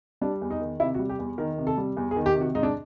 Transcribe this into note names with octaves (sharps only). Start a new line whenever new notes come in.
G3 D4
E2
D#4
D#3
C3 E4
F#4
G3
G4
E2
D#3 A#4
C3
A4
G3
E2
G#4
D#3
G4
C3
F#4
G#2 D#4
D4